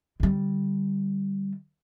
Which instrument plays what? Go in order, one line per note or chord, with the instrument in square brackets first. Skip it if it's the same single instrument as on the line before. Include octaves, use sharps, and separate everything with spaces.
[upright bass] D3 G3